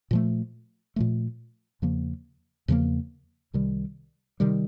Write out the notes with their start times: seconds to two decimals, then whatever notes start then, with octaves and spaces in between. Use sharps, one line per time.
0.11 A#2 F3 A3
0.96 A#2 F3 A3
1.82 E2 C#3 F3 A#3
2.68 E2 C#3 F3 A#3
3.53 C2 C3 D#3 G3
4.40 C3 D#3 G3